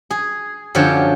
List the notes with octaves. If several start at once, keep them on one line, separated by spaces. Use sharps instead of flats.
G#4
F#2 D3 F3 G4 C#5 D5